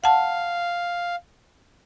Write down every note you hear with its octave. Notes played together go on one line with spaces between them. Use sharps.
F5 F#5 A5